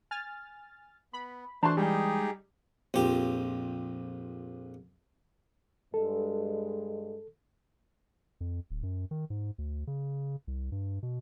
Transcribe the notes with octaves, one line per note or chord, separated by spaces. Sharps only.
G#5 F6 A6
B3 B5
E3 A3 D4 F#4 C5 A5 C6
G3 G#3 D#4 G4 G#4 G5
A#1 F2 G4
G2 G#3 A4
F2
D1
F#2
D#3
G#2
D2
C#3
C2
G2
B2